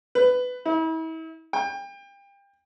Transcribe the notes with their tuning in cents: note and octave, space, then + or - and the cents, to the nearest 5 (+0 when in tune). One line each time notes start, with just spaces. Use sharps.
B4 +15
E4 -40
G5 +30